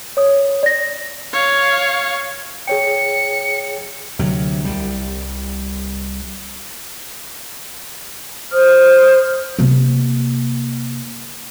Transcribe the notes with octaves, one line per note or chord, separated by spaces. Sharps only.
C#5 D#6
D5 A#6
C#5 F5
G#4 C#5 G5 C#7
D2 C3 F#3
C2 G3
C5 D#6 F6
C3 A#3